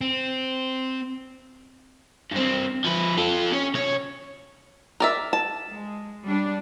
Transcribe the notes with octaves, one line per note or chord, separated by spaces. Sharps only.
C4
G2 C4
F3 B4
F4 A4
C#4 C#5
C3 C#5
A#4 D5 E5
A5
G#3
G3 D4